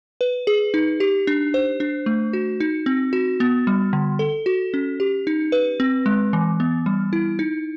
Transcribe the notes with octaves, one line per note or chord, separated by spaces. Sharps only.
B4
G#4
D#4
G4
D4
C5
D4
A3
F#4
D#4
C4
F#4
B3
G3
D3
A4
F#4
C#4
G4
D#4
B4
C4
G#3
E3
B3
G3
E4
D#4